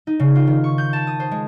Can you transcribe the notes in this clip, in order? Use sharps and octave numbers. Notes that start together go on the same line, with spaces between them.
D#4
C#3
F4
D#3
C#6
G6
A5
D#6
C5
G#3